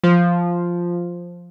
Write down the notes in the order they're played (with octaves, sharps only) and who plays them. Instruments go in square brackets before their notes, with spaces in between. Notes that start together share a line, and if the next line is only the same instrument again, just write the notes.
[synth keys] F3